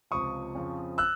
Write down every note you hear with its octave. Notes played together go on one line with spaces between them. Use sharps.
C#2 C3 F3 C#6 D#6
F2 C#3 F3
E6 F#6